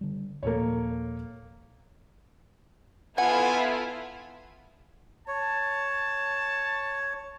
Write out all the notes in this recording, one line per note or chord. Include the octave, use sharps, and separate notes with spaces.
D3 G3
D#2 A#2 F3 A#3 A4 C#5
B3 E4 F4 A4 F#5 G#5
C#5 A5